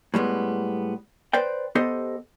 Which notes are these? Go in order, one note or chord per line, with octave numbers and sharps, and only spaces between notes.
A2 G3 G#3 B3
B4 C5 D5 G5
B3 G4 A4 C5 D#5